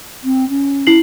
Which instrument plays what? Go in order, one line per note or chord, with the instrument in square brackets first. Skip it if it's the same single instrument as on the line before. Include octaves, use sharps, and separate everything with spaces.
[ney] C4
C#4
[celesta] E4 C7 F#7